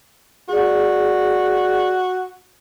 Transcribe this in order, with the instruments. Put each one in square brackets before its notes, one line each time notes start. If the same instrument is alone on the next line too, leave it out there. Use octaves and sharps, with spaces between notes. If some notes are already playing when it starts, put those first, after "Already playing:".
[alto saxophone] F#4 [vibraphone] G#4 D5